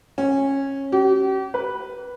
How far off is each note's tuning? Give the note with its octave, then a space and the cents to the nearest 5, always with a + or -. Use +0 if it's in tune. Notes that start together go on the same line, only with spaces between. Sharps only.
C#4 -15
G4 -40
B4 -5